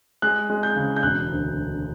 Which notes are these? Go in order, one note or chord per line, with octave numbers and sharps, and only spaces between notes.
G#3 F#6
G#3
G6
C#3
G6
E1 F#6
D2